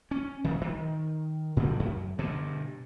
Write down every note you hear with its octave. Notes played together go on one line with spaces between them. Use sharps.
C#4
D#1 C2 D#3
D#3
A#2 D3 F#3 G3
F#2
G2 B2 D3